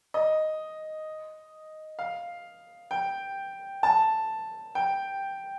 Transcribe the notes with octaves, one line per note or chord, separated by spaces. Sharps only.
D#5
F5
G5
A5
G5